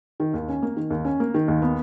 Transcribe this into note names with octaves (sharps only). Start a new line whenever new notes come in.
D#3
D#2
C#4
A#3
D#3
D#2
C#4
A#3
D#3
D#2
B3